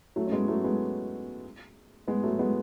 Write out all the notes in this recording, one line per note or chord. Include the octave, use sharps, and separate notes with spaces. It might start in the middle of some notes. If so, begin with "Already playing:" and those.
F#3 A3
C#4
G#3 B3
F#3 A3
G#3 B3
G#3 B3
F#3 A3
G#3 B3